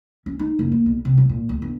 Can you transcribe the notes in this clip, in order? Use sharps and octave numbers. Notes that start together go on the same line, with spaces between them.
C#4
D#4
F#1
A#3
B1
C3
F#3
A#2
D2
G1